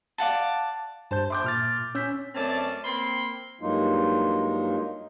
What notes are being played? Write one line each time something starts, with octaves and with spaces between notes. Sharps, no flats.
D5 F5 F#5 A5
G2 C5 A5 G6
E5 C6 D6 G6
A#2 F6 A6
C#4 E6 G6 B6
F#2 A3 C4 C#4 D5 A5
A#3 C4 B5 C6
G2 F#3 G#3 A#3 D#4 F4